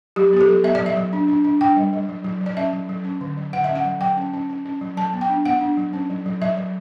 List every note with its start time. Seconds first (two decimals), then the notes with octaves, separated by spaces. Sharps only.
0.16 F#3 G4
0.33 B3 G4
0.41 A4
0.49 F#3
0.64 B3 E5
0.75 D5
0.81 F#3
0.86 E5
0.96 F#3
1.13 D4
1.28 D4
1.45 D4
1.61 D4 G5
1.76 G3
1.93 G3
2.09 F#3
2.24 F#3
2.41 F#3
2.46 D5
2.57 C#4 E5
2.73 F#3
2.89 F#3
3.05 C#4
3.21 D3
3.37 F#3
3.53 D3 F#5
3.64 E5
3.70 C#4
3.75 F#5
3.85 F#3
4.01 F#3 G5
4.17 C#4
4.33 C#4
4.49 C#4
4.65 C#4
4.81 F#3
4.97 F#3 A5
5.13 B3
5.21 G5
5.29 D4
5.45 B3 F#5
5.61 D4
5.77 F#3
5.93 C#4
6.10 F#3
6.26 F#3
6.42 F#3 E5
6.57 F#3